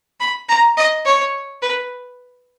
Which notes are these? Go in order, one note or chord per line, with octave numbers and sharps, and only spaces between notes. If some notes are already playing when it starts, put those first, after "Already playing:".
B5
A#5
D#5
C#5
B4